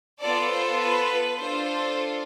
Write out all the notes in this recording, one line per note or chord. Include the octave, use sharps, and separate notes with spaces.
B3 F4 A4 D5
C5
B4
D4 F4 A4 C5